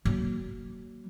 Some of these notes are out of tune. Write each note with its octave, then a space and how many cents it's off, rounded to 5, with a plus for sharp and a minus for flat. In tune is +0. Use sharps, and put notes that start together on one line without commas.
F#3 +15 A#3 +0